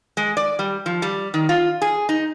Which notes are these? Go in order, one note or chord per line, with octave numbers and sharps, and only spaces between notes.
G#3
D5
G3
F3
G3
D#3
F4
G#4
D#4